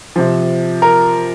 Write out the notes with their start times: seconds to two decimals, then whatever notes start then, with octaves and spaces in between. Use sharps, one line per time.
0.16 C3 F3
0.82 A#4